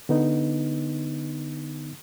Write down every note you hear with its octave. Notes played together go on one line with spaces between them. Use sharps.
D3 B3 D#4